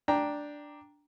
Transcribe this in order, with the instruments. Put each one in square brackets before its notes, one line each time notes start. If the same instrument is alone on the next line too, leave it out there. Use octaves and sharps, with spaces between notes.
[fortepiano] D4 G5 A#5